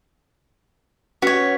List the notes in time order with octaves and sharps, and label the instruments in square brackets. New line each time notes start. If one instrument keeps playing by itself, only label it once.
[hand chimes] C#4 B4 B6 [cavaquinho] F#4 C#5